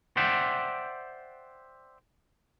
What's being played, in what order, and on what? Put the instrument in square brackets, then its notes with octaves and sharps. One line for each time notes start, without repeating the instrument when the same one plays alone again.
[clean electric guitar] C5 D5 E5 F#5 G5